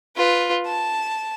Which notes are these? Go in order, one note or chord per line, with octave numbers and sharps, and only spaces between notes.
F4 B4
A5